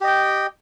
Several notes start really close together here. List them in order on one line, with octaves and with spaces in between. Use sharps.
G4 D#5 G5